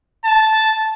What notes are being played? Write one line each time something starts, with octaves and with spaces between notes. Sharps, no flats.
A5